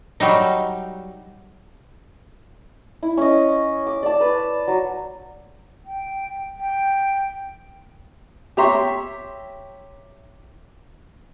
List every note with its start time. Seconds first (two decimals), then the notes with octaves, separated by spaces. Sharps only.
0.20 F#3 G3 D#4
3.03 E4
3.17 C#4 D#5
3.87 D6
4.03 D5 A5
4.21 B4
4.68 F#3
5.85 G5
6.59 G5
8.57 G4 C#5 E5 A#5 C6 C#6